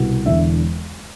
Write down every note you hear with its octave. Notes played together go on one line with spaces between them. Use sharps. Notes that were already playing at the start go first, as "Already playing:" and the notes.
Already playing: C2 B2 B3
E1 E2 D3 E5